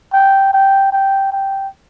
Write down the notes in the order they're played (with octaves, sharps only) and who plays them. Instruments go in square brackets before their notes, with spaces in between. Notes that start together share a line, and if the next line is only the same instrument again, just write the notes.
[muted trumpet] G5
G5
G5
G5